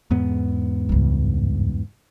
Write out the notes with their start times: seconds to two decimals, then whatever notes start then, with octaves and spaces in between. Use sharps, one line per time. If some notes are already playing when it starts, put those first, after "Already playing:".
0.11 E2 G#2 B3
0.89 C#2 G2